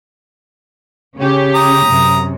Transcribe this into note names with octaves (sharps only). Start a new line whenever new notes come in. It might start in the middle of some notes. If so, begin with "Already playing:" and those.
C#3 C#4 G4
A#5 D#6
F#2 C3